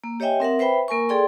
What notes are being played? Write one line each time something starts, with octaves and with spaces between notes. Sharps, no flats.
A#3
G4 C#5 D#5 E5 G5 G#5
C4 A#4 E5 F#5
B4 C5 E5 G5 B5
A#3 A#4 G#5 C#6
G#4 A4 D5 G5 C6